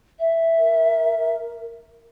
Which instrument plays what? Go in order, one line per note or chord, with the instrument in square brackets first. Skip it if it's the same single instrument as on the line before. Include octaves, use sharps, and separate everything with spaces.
[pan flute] E5
[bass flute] A#4